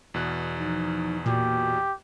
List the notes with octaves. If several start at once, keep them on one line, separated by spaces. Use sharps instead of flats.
E2 B2 F#6
F3 D#4
A#2 F#4 G4